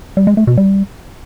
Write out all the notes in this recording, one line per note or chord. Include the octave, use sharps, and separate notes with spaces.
G3
G#3
A3
B2
G3